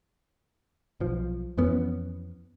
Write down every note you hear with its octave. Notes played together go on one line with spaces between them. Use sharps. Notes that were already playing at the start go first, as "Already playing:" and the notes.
B1 F3
F2 E3 B3 C#4